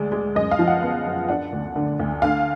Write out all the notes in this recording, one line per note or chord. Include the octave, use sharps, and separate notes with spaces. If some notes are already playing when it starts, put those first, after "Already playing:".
Already playing: D2 G#3 D5
G#3
F#2 D#5
F5
F3
F#5
B3
F#2
D4 F#5
D2
D3
D2
D3 F5